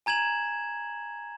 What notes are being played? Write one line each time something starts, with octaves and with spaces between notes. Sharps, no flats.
G#5 A#5 G#6 E7 F#7